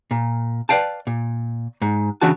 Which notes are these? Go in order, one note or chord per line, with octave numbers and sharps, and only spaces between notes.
A#2
B4 D5 F5 G5 A5
A#2
G#2
C#3 E3 D4 F#4 A5